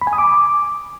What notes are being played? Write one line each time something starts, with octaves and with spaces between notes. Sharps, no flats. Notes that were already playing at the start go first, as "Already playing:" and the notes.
B5
G#5
D#6
D6